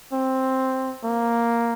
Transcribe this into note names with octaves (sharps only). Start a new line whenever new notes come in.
C4
A#3